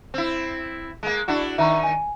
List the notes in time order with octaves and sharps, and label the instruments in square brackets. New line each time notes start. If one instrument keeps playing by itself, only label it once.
[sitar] C4 E4
G#3 A#3
D4 E4 F#4
[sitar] D#3 D#4 [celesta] E5 A#5 C#6
[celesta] G#5